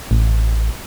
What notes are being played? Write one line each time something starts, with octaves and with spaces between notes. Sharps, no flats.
A1